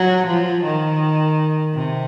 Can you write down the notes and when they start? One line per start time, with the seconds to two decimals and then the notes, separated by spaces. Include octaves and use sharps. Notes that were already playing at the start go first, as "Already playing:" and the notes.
Already playing: F#3
0.27 F3
0.64 D#3
1.74 C3